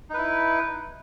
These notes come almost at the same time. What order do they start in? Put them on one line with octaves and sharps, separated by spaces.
D#4 B4 E4